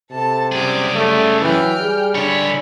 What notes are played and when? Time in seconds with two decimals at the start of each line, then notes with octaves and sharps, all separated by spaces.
0.11 C3 A4 A5
0.52 F#2 G3 G4 G#4 D6
0.95 A3
1.41 E3 F#3 G5 F6
1.78 G3 G#4
2.15 D3 D4 C#5 G#5 B5